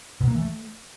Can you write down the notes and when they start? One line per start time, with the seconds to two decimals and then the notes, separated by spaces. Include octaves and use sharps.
0.21 B2
0.28 A#3
0.35 E3
0.42 A3